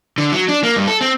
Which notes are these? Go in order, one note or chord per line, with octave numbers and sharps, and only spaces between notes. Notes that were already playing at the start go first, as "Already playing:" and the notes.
D3
F#3
D4
A#3
G2
A4
C4